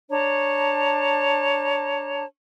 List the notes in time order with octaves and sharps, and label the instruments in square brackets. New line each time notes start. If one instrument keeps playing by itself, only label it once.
[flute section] D4 C#5 A5 A#5